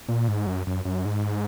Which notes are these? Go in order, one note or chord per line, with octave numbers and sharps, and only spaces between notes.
A#2
G#2
F#2
F#2
F#2
G#2